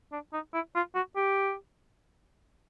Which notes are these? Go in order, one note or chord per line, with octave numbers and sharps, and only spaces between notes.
D4
D#4
E4
F4
F#4
G4